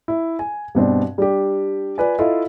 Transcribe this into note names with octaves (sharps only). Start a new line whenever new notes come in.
E4
G#5
G2 B2 C4 D4
G3 D4 G4
F4 B4 D5 G#5
E4 F4 A4 D#5 F5